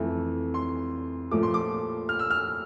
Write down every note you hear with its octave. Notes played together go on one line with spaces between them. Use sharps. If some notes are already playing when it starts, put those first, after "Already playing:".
Already playing: F2 E3 A3
C6
A#2 F3 A3 D6
C6
D6
F6
E6
F6